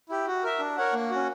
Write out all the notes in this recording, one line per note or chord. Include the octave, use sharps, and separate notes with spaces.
E4 G4
F#4
A#4 E5
D4
A#4 C#5 F#5
A#3
C#4 F#4